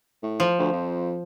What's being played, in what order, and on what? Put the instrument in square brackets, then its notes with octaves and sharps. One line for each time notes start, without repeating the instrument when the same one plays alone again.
[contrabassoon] A2
[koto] F3
[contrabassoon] D2
F2